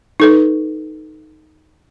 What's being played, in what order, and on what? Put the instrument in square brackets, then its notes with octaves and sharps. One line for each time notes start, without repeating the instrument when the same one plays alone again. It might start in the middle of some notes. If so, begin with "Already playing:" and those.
[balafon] D#4 A4 B4